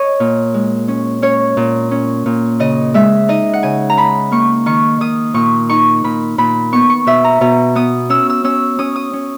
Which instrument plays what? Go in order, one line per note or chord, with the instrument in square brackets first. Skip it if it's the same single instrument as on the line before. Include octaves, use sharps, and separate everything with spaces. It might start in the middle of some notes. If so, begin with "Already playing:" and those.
Already playing: [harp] C#5 D#5
A#2
G#3
C#4
C#4 C#5
A#2
C#4
A#2
C#3 D#5
G#3 E5
D#4 D#5
F#5
C#3 G#5
A#5
D#4 B5
A#3 C#6
D#3 C#6
D#3 D#6
A#2 C#6
D#4 C#6
A#2 B5
A#2 B5
B3 C#6
C#6
B2 E5
A#5
B2 A#5
B3 D#6
C#4 E6
E6
C#4 E6
C#4 D#6
D#6
C#4